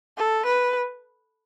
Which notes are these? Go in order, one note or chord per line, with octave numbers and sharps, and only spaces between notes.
A4
B4